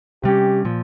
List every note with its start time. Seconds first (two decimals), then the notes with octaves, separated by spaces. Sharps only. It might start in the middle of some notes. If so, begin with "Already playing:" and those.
0.24 C3 G3 C#4 G4
0.65 A#2 F3